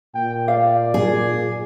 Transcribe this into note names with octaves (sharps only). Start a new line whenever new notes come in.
A#2 G5
D5 F5
G#4